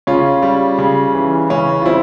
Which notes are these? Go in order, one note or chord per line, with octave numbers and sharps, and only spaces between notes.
C#3 C#4 F4
G3
C#3
E3
C#3 C#4
F4
G3 C4 E4